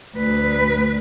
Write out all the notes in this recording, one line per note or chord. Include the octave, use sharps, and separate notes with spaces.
D2 B4